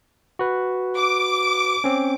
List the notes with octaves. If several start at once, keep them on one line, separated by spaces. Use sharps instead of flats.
F#4 B4
D6
C4 C#4